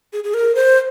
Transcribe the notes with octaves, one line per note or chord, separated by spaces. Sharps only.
G#4
G#4
A#4
C5